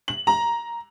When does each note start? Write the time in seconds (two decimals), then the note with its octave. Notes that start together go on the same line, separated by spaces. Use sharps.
0.08 F#7
0.27 A#5